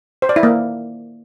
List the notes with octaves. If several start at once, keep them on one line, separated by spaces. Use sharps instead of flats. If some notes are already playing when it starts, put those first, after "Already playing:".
C5
D5
E4
A#3